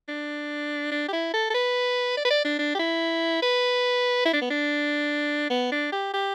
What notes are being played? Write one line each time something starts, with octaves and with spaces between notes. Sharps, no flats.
D4
D4
G4
E4
A4
A4
B4
D5
B4
D5
D4
D4
G4
E4
B4
E4
D4
B3
D4
B3
D4
G4
G4